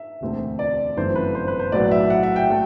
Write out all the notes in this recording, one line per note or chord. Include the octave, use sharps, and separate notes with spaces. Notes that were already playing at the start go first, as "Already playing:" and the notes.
Already playing: E5
E1 D2 D3 A3 C4
D5
G1 F#2 E3 A3 C4 C5
B4
C5
B4
C5
B1 A2 F#3 B3 D5
E5
F#5
E5
G5
F#3 A3